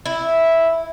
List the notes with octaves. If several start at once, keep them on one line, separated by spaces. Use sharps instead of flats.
E4